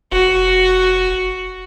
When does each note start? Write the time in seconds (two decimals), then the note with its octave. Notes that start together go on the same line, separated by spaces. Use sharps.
0.12 F1 F#4